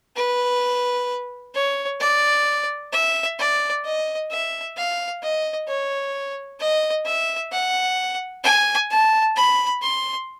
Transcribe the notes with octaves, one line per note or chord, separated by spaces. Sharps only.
B4
C#5
D5
E5
D5
D#5
E5
F5
D#5
C#5
D#5
E5
F#5
G#5
A5
B5
C6